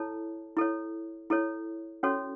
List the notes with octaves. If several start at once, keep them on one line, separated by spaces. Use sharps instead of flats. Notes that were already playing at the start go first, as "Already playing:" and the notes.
Already playing: E4 A4 C#5 A5
E4 A4 C#5
E4 A4 C#5
C#4 F#4 A4 C#5